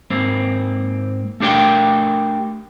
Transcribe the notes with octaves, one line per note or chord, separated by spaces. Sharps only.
G#2 A#3 C4
A3 D4 G4 A#4 G5